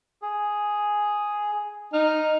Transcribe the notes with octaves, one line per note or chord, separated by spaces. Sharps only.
G#4
D#4 F6